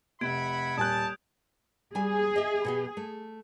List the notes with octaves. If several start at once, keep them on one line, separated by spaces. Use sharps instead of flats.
F1 E5 F#5 B5 G#6 D7
D#1 G#5 A5 D#6 F#6 G6
G3 G#4 G#5
D#5 E5
B2 B3 G4
A3